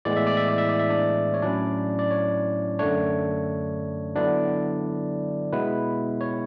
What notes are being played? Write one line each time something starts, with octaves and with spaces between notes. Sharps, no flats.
A2 E3 G#3 B3 D5
E5
D5
E5
D5
E5
D5
E5
D4 D5
C#5
A2 F#3 C#4 D4 E4 D5
D5
C#5
F#2 D3 A3 D4 C#5
D3 F#3 B3 D4 E4 D5
B2 G#3 B3 E4 B4
C#5